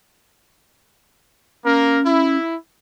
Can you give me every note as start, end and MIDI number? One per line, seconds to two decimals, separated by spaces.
1.65 2.00 58
1.65 2.37 61
1.65 2.00 70
2.05 2.55 64